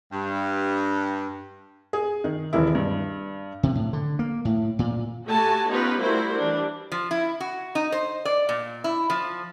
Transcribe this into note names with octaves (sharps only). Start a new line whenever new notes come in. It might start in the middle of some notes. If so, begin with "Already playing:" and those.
G2
G#4
D#3
D#1 E3 G#3 E4
G2
C3
A2
D3
A#3
A2
A#2
A3 F#4 G4 G#5 A5
B3 C#4 D#4 F4 G4 B4
G3 A3 E4 F#4 A#4 C5
E3 G3 D4
F3
E4
F#4
D#4
C5
D5
A#2
E4
F3